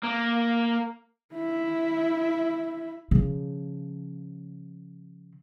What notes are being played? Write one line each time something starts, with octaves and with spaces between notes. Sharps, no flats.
A#3
E4 E5
C#3 F3